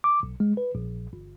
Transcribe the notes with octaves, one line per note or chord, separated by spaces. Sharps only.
D6
B1
G#3
B4
A#1
G1